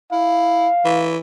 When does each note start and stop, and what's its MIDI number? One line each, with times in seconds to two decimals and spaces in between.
0.12 0.68 64
0.12 1.10 77
0.85 1.18 52